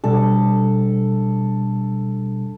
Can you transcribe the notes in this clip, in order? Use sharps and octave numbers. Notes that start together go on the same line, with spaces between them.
B2 G3 D4 A4